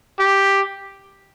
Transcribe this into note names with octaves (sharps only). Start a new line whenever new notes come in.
G4